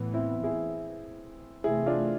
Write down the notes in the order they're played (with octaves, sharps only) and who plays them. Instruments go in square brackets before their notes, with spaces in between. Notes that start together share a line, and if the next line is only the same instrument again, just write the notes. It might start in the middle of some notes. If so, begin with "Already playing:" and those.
Already playing: [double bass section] A2 E3 B3
[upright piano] C4 E4
E4 G#4
[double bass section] C3 E3 A3 C4 [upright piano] E4 G#4
[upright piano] D4 F4